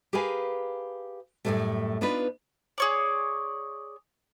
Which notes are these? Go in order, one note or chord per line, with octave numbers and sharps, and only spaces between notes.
G4 G#4 A#4 B4 F5 G#5
F#2 A2 D#3 E3 G3 A3
B3 D4 D#4 F4 B4
G#4 C#5 D5